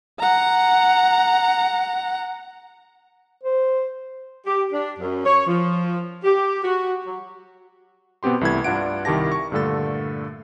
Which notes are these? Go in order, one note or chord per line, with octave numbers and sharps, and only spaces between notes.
F#5 A#5
C5
G4
D4
F#2
C#5
F3
G4
F#4
F#3
B2 B3 C4 G4 C6
C2 E3 A3 E4 B4 G#6
G2 D4 F4 F#5 D7
C2 D#3 E4 G4 A5 A#6
C#6
G2 A#2 D3 A3 A4 A6